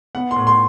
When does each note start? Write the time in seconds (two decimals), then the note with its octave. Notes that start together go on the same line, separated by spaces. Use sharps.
0.15 B3 F#5
0.31 C6
0.36 A2
0.47 C6